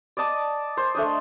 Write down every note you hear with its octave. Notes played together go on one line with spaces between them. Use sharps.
D5 D#5 A5 D6
C5
A3 D4 D#5